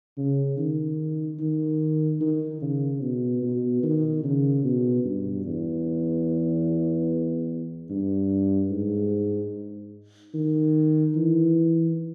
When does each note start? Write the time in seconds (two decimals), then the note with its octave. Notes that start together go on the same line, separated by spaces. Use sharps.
0.17 C#3
0.58 D#3
1.40 D#3
2.21 D#3
2.62 C#3
3.02 B2
3.43 B2
3.83 D#3
4.23 C#3
4.64 B2
5.05 G2
5.46 E2
7.90 G2
8.70 G#2
10.34 D#3
11.15 E3